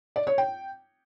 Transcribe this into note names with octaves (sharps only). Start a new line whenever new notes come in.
D5
C#5
G5